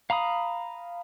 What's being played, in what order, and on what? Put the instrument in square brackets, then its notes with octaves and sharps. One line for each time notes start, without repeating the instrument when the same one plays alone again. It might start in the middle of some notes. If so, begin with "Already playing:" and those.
[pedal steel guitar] F5 A#5 B5 D#6